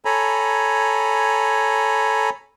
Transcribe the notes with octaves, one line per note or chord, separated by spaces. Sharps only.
A4 C#5 G#5 A#5 B5